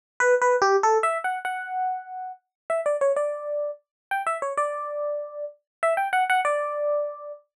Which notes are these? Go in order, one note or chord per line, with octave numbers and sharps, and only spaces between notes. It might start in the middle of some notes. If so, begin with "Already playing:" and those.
B4
B4
G4
A4
E5
F#5
F#5
E5
D5
C#5
D5
G5
E5
C#5
D5
E5
G5
F#5
F#5
D5